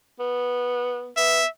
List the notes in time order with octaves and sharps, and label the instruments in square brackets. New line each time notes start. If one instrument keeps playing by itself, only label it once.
[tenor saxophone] B3
[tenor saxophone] B3 [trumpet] E5